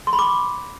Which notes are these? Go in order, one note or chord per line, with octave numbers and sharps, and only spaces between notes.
C6
B5
D6